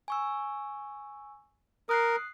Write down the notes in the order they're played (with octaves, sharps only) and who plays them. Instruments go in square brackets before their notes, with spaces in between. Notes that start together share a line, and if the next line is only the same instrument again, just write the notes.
[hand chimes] G#5 C#6 E6
[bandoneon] A#4 [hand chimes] D#6 F#6 C7